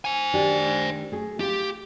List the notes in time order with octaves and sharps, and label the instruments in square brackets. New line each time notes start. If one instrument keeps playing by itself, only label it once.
[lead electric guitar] C5 G#5
[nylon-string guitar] D#3 D4 G4
A3 G#4
[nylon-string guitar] F4 [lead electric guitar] G4